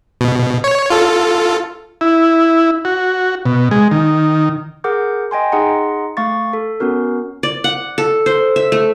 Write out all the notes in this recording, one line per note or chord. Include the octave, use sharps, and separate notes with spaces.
B2
C#5
F4 A4
E4
F#4
B2
G#3
D#3
G#4 A#4 F#5 D6 G6
D#5 G5 G#5 C6
D#4 G#4 D#5 F#5 A#5 C6
A3 F5 C#6 A6
A4
B3 C#4 F#4 A#4
D5
F#5
A4
C5
E5
A3